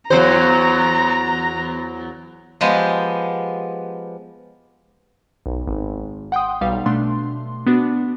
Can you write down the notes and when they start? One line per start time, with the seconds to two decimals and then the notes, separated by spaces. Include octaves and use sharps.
0.10 E2 F#3 C5 A#5
2.61 F3 G#3 B3 G4
5.46 B1
5.68 G#1
6.32 F#5 G5 C6 D#6
6.61 B1 G3 F5
6.86 B2 A3 D4 C6
7.66 B3 D4 F#4